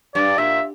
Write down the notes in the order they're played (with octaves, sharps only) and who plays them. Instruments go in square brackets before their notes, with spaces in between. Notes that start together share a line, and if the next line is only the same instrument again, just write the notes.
[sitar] G2 [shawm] D5
[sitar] A#2 [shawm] E5